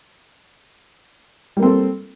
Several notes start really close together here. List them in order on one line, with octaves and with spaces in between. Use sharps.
G3 A#3 C4 A4